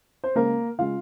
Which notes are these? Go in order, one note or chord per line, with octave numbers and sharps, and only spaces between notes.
C5
C#3 G#3 A#3 A#4
C#3 G#3 F4 F5